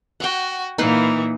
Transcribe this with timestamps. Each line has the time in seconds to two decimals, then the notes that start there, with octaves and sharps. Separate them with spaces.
0.20 F#4 F#5 G5
0.78 A#2 E3 A#3 D#4 B4 C5